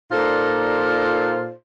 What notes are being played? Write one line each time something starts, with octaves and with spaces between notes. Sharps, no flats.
A#2 D#4 F4 A4 C5 D5